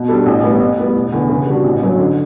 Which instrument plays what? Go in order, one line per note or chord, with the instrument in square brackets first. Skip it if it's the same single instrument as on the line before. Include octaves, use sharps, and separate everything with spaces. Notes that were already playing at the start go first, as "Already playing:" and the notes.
Already playing: [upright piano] B2
G3 D4 A4
A1
A2 G3 B3
A2
G3 B3
E1
E2 D3
C#3
G3 D4 F#4
A1
G2 F#3 C#4
D3